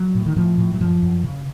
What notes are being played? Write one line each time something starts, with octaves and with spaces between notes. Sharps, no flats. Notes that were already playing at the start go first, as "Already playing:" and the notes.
Already playing: F#3
A2
D#3
A2 F3
A2
F#3
F#2 F3
F#2
C#3